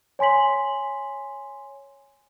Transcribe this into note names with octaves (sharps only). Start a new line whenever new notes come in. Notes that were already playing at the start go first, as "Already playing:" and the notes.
C#5 G#5 C6 B6 F#7